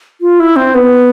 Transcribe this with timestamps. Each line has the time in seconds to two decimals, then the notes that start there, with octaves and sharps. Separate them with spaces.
0.21 F4
0.40 E4
0.56 C4
0.75 B3